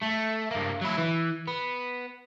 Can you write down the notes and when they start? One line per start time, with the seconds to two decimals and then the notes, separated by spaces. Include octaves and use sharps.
0.02 A3
0.51 G2 A#3
0.81 F#3 E4
0.98 E3
1.48 B3